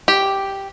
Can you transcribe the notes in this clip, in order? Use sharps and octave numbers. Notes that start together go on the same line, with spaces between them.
G4